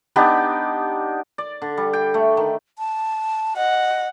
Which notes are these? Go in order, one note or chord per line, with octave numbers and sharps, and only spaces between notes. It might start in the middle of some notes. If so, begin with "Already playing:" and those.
B3 D4 D#4 G4
D5
D3
G3
G5
A3
D#3
A5
D#5 F#5